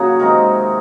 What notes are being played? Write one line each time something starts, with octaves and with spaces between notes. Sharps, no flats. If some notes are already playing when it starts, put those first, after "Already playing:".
Already playing: A#2 C#3 F#3 A#3 F#4 G#4
C3 D#3 G#3 A#4